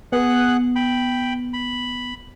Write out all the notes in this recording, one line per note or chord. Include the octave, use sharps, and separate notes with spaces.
B3 G#4 F#5 F#6
G5 B5
B5